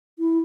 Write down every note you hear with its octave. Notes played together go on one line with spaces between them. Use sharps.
E4